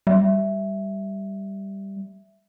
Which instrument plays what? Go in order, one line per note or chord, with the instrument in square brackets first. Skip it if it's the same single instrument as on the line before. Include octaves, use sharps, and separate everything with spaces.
[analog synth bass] G3 [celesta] E5